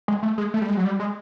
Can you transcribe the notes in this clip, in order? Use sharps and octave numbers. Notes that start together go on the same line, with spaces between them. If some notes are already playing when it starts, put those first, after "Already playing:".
G#3
A3
G#3
A3
G3
G#3
F#3
G3
G#3